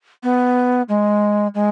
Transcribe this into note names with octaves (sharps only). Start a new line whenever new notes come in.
B3
G#3
G#3